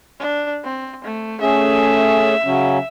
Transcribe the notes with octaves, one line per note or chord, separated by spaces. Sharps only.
D4
C4
A3
A3 C#4 G#4 E5
C#3 F#3 C#4